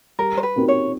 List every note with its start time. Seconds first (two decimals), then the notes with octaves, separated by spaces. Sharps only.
0.19 G3 A#4
0.37 C5
0.43 B4
0.56 C4 D#4 F#4 A#4
0.68 C#5